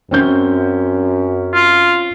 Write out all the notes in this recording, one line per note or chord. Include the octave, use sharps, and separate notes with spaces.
F#2 C4 C#4 G6
F4